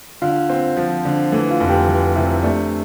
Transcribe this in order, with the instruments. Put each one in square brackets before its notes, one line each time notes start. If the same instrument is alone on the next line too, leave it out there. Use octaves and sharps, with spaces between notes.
[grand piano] D3 [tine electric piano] F4 F5
[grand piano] C4
F3
D3
[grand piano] E3 [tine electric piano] A3 A4
[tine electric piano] F4 F5
[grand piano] F1
[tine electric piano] G4 G5
[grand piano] E3
[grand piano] C3 [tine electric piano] E4 E5
[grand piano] A3 [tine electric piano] D4 D5